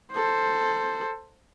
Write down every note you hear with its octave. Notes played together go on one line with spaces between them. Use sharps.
A4 C5